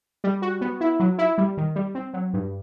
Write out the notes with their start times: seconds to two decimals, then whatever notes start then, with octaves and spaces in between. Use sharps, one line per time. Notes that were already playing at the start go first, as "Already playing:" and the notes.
0.24 G3
0.42 F#4
0.61 B3
0.81 E4
1.00 F#3
1.18 E4
1.38 G3
1.57 D#3
1.76 G3
1.95 C4
2.14 F#3
2.33 G2